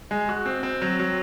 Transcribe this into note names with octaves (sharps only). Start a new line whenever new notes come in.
G#3
F#4
C4
C4
F#3
F#3